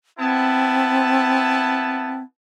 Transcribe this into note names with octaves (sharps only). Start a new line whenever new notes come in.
B3 C4 E4 A5